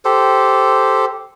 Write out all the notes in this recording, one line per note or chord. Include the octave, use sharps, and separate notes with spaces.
G4 A4 C5